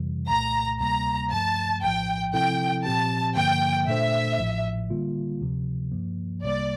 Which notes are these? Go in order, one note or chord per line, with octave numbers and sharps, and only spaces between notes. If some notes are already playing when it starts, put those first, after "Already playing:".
Already playing: F2 C3 E3 G3
C2 A#2 A3 A#5
D2 C3 G3 A#3 A#5
G2 F3 A3 A5
A#1 A2 F3 G5
C3 F3 C4 E4 A4 G5
A#2 F3 C4 G4 A5
G2 D3 F3 A#3 G5
A#2 A3 D4 A4 C5 E5
A1 A2 F3
D3 G3 A#3 F4
D2 C3 F3
G2 F3 A#3
C2 C3 G3 A#3 D5